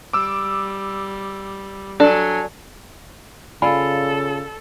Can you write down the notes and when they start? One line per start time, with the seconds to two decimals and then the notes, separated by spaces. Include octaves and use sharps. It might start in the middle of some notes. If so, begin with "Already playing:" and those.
0.13 G3 D6 E6
2.00 F#3 D4 A4 G#5
3.62 C#3 F4 A4 D5 G#5 B5